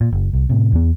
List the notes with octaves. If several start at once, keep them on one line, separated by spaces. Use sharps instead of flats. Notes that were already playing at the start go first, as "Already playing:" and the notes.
A#2
F#1
C2
A2 C3
E2 B3